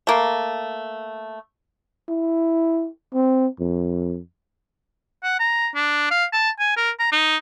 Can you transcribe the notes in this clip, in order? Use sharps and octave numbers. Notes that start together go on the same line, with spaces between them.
A3 A#3
E4
C4
F2
F#5
A#5
D4
F5
A5
G#5
A#4
A#5
D#4